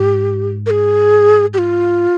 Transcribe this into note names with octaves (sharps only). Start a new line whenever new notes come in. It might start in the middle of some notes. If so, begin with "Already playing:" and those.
Already playing: G#2 G4
A#4
G#4
G4
F4